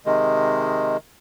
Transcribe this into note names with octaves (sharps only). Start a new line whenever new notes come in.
C3 D#3 G#3